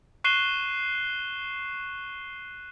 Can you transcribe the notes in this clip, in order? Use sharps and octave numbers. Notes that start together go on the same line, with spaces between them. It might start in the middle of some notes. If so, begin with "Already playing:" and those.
C#6 F#6 C7 D#7 E7 G7